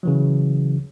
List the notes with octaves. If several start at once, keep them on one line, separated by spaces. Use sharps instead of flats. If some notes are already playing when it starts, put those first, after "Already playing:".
C#3 E3 F#3